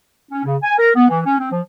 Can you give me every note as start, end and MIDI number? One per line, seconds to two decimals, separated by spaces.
0.31 0.43 61
0.44 0.56 49
0.62 0.74 80
0.78 0.90 70
0.95 1.06 59
1.09 1.19 52
1.25 1.34 61
1.39 1.50 60
1.51 1.60 53